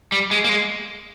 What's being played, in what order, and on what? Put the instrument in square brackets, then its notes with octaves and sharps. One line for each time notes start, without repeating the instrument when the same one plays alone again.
[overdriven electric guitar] G3
G#3
A#3
G#3